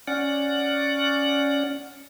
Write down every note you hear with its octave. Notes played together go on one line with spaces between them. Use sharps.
C#4 D5 F#5